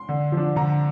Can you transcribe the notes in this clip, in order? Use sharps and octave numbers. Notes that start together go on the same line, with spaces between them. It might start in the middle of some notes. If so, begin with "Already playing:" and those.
Already playing: C6
D3
F3 D4
D3 A#5